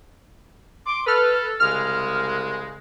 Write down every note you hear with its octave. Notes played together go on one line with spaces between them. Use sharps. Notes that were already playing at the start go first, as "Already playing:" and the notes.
C6 D6
A4 B4 F6
C2 C#3 G#3 F6